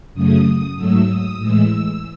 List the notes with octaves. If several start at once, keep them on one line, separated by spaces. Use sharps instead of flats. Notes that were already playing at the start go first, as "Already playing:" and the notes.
F#2 C#3 F#3 A3 D#6
G#2 F#3 A3 E6
D#6
A2 E3 G#3 E6